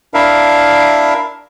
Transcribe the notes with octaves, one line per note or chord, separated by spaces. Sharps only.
D4 E4 A#4 E5 F5